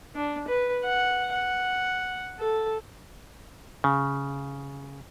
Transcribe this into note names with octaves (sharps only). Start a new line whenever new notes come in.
D4
B4
F#5
F#5
A4
C#3